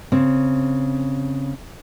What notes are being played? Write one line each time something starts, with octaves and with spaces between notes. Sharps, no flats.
C#3 C4